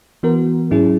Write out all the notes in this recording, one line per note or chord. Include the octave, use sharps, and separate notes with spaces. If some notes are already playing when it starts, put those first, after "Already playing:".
E3 B3 F#4 A#4
G#2 F#3 C#4 E4 G#4